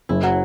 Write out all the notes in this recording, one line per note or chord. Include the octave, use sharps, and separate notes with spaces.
F#1 E4
F#3